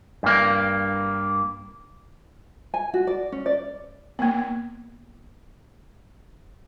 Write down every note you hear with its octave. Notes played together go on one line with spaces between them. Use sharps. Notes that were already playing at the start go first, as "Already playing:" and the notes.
G2 A#3
G#5
F#4
D5
C#4
D5
A#3 B3